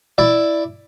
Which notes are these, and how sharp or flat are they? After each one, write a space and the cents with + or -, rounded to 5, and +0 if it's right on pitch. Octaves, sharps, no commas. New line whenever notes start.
E4 +0 D5 +5